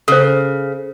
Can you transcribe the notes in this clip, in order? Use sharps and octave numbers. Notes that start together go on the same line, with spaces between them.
C#3 A4 C5